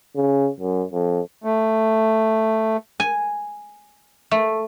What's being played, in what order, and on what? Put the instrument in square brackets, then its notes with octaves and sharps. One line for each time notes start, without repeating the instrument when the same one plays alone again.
[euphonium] C#3
F#2
F2
[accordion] A3
[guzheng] G#5
A3